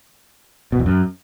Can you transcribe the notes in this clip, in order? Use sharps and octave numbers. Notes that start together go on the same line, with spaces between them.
B2
E2
F#2